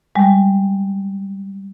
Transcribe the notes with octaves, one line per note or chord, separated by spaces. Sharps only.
G3 G#3